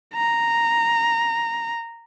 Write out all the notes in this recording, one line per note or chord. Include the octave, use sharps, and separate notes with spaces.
A#5